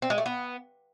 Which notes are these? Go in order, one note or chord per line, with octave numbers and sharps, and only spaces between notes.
C4
G#3
A3
B3